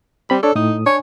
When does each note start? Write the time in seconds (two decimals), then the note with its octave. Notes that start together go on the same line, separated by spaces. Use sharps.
0.30 G3 C4 B5
0.43 D4 A4 C#5 D5
0.55 A2 D#4 D#6
0.86 D4 C#5 G#5